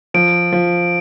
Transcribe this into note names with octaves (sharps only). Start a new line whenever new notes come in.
F3 D7
F3